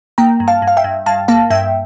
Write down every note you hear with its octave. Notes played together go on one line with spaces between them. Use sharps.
A#3 G5 A#5
G2
F5 A5
G2
F5
E5 G5
G2
G2 F5 A5
A#3 F5 A5
G2 E5 G5